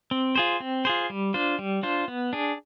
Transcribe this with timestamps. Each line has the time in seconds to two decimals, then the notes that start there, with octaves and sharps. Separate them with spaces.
0.11 C4
0.36 F4 G#4 C5
0.60 C4
0.85 F4 G#4 C5
1.10 G3
1.34 D4 F4 C5
1.59 G3
1.83 D4 F4 C5
2.08 B3
2.33 D4 G#4